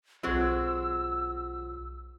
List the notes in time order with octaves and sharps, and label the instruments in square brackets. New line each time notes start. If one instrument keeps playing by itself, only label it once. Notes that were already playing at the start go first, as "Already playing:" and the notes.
[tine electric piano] B1 F4 [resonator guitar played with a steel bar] F#3 G#3 C4 [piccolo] E6